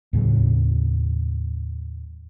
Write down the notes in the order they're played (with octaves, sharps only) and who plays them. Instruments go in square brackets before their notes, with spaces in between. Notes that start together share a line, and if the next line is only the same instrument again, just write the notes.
[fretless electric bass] D#2 A2 C#3 F#3